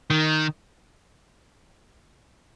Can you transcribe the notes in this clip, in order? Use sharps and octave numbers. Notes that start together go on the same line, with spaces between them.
D#3